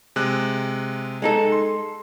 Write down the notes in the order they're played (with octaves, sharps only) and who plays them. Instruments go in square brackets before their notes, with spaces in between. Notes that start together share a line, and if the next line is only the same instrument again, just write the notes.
[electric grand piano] C3 G#3 F#6
[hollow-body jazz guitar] G#3 D#4 A4
[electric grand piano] C6